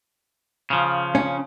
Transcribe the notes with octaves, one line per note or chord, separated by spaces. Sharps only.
C#3 F3
C#4